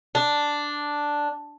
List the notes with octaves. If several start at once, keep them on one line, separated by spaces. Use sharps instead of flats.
D4